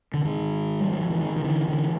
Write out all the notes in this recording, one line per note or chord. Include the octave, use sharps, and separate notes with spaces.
D3
G#2 D#3
G3
F#3
F3
E3
D#3
D#3
D3 E3
D3 E3